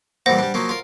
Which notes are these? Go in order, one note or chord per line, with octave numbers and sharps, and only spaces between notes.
A#2 E3 G3 C5 F#5 A#6
G3 D4
F3 F#3 A#3
F4 A#4